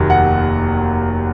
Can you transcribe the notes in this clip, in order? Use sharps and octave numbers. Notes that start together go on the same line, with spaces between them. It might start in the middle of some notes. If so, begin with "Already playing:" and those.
Already playing: F1 D#2 D#3 F#3
F#5